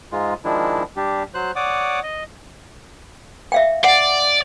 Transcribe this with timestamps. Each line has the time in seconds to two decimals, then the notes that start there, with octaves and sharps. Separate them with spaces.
0.12 G#2 G#3 F4
0.45 D#3 F3 G#3 D4 E4
0.96 G3 D4 G4
1.34 F#3 C5 F#6
1.56 C#5 D5 F#5 D6 D#6
2.03 D#5
3.52 E5 F5 G5
3.84 D5 F#5